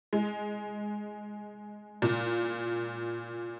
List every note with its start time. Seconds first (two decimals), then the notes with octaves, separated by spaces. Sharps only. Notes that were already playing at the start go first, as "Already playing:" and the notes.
0.13 G#3
2.02 A#2